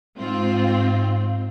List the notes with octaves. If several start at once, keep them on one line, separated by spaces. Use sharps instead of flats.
G#2 C4 F4